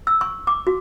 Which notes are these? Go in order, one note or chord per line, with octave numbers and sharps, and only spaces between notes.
E6
C#6
D6
F#4